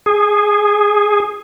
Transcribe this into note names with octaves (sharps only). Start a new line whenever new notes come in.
G#4